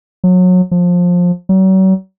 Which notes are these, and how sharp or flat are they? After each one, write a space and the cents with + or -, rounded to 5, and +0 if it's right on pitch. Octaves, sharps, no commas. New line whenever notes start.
F#3 -25
F3 +20
F#3 +40